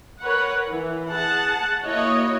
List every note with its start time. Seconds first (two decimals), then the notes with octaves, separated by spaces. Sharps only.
0.21 A#4 B4 C#5 F#5
0.68 E3
1.08 G#4 F#5 A5
1.83 A#3 E4 F#4 C#5 D#5